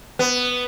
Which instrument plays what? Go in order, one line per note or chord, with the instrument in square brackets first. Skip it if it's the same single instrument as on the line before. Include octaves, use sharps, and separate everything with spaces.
[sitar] B3